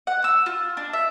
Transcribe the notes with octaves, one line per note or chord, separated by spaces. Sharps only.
F#5
E6
F4
D4
E5